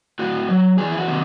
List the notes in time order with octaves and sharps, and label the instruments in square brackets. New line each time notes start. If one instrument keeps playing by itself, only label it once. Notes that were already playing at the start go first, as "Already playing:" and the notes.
[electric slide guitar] A2 F#4
F#3
E2 G#4
E4
F#4
C3 D#3